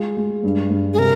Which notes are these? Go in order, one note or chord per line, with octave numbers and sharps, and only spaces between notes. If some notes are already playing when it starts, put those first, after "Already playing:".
Already playing: G#3 F4
G#3
G2
G2
G#4
C3 A#4